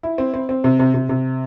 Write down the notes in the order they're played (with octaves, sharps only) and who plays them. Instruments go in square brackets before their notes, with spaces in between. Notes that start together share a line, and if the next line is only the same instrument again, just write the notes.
[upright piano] E4
C4
C4
C4
C3
C3
C3
C3